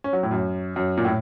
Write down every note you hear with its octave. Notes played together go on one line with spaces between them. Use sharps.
C#4
F#3
A2
F#2
F#2
A#2
A2